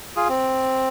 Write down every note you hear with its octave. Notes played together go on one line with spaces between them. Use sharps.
F4 G#4
C4